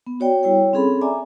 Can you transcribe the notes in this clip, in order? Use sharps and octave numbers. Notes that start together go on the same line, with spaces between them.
B3
F#4 C#5 D5 G5
G3 E4 C#5 G5
C4 C#4 G#4 A4 B5
D5 E5 G#5 A#5 D6